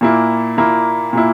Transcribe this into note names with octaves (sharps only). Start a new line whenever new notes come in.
A#2 A#3 E4
A#2 A#3 E4
A#2 A#3 E4